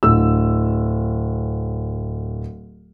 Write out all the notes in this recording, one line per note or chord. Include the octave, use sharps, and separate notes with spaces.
D1 E6